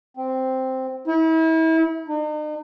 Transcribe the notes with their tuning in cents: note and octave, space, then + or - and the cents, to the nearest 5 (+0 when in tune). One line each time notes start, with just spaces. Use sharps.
C4 -5
E4 -35
D#4 -45